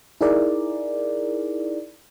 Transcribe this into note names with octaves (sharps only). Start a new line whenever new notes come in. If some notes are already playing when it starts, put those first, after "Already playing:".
D#4 E4 G#4 A#4 D5